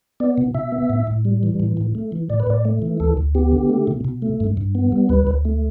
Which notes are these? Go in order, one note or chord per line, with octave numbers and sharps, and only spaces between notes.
B3 D5
B2
B2 E5
B3
A2
A2
G3
E3
A2
A2
A3
E3
A2 D5
B4
A2 D5
A3
E3
D2 A4
D2
B3 G4
D3
A3
B2
B2
A3
G2
G2
B3
G3
D2 B4
D2
A3